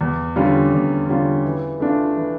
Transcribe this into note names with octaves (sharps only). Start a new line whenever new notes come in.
E2
D3 G3 C#4 F4
E2
D3 G3 C#4 F4
E3
A3 D4 F4
E3